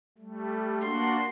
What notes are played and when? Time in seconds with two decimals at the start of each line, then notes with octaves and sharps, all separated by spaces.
0.18 G3 A3
0.81 A#3 D4 F#4 C6